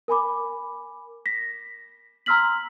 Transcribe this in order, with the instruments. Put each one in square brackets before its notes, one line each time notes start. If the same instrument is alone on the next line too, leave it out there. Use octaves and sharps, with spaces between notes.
[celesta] A#4 G#5 B5 D6
A#6 B6
A#5 C6 E6 F6 B6 F#7